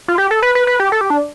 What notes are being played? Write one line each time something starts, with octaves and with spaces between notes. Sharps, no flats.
F4
G4
A4
B4
B4
B4
G4
A4
G4
D4